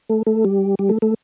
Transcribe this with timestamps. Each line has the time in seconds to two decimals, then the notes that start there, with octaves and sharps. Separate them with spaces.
0.09 A3
0.27 A3
0.45 G3
0.79 G3
0.89 A3
1.02 A3